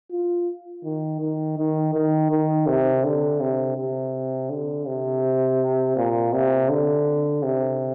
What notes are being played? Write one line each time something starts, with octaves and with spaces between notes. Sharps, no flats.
F4
D#3
D#3
D#3
D#3
D#3
C3
D3
C3
C3
D3
C3
A#2
C3
D3
C3